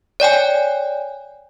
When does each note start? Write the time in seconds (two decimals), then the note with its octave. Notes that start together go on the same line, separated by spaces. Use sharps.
0.20 C#5 D5 G5 G#5